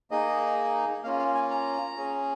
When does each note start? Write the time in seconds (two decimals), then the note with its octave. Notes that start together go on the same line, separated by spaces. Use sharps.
0.11 A#3 D#4 G#4 D#5
1.03 A#3 C#4 F4 F5
1.19 F5
1.35 G#5
1.50 A#5
1.96 C#4 G#4